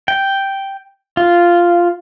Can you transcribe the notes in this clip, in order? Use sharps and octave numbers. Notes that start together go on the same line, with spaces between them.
G5
F4